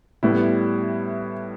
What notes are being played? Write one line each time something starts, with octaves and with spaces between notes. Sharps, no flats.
A2 G3 B3 E4